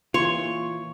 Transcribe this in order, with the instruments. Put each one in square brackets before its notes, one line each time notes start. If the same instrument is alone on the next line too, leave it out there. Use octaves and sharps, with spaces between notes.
[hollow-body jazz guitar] A#2 E3 F4 [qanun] C#5 [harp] C6